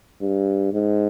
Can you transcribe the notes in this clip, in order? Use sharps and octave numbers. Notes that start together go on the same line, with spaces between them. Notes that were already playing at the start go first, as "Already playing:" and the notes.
G2
G#2